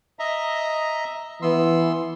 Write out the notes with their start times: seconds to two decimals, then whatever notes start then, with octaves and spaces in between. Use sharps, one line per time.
0.19 D#5 E5 A#5
1.42 E3 B3 C6 E6